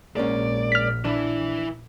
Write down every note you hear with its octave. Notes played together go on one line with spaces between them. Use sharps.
A#1 G#2 A#3 C#4 D5
F6 B6
E3 D4 E4